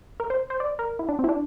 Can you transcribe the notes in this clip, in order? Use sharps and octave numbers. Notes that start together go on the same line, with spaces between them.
A#4
C5
C5
D5
A#4
E4
D4
C4
E4
D4